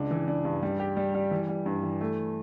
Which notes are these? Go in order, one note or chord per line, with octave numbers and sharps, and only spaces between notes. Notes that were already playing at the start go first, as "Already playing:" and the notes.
Already playing: C#2 D4
E3
D4
G2
G3
G4
G3
G3
E3
G3
G2
E3
A3